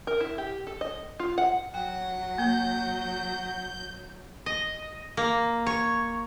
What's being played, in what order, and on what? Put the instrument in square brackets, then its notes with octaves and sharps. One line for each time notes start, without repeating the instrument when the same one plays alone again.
[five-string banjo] A#4
E4
G4
A4
D#5
F4
F#5
[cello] F#3 [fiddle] F#5 [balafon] G5
[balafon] A#3 [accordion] G6
[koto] D#5
A#3
C#5